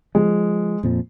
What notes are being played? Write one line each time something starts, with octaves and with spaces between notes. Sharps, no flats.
F3 G#3
F2 A#2 F3